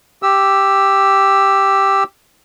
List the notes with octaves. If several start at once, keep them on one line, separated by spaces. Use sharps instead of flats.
G4 E6